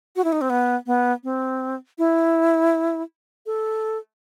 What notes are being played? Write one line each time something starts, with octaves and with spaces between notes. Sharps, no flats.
F#4
E4
D#4
C4
B3
B3
C4
E4
A4